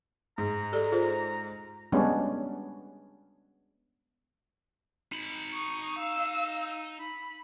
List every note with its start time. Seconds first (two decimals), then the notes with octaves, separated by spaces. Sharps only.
0.38 G#2 A#5
0.73 G4 A4 D5
0.92 F4 G#4 C5
1.92 G3 G#3 B3 C#4 D4
5.12 D#4 B5
5.53 C#6 D#6
5.98 F5 E6
7.00 B5